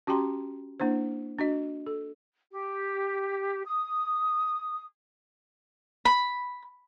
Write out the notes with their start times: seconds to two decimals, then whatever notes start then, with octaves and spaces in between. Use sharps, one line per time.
0.07 C#4 F#4 G4 G5 A#5 C6
0.80 A#3 D4 E4 C5
1.39 D4 F#4 D#5
1.86 A4
2.51 G4
3.66 D#6
6.05 B5